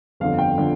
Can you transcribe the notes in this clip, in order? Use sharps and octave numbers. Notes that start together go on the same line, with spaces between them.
G1 F2 D3 F3 F5
G5
D3 F3